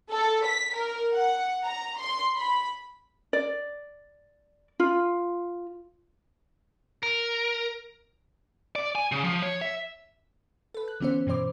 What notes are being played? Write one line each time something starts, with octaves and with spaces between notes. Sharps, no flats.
A4
B6
A#4
F#5
A#5
C6
B5
D5
F4
A#4
D5
G#5
C#3
F3
C#5
E5
A4 B4
F#6
D3 E3 B3 C#4 C5
G2 B2 E3 C5 D6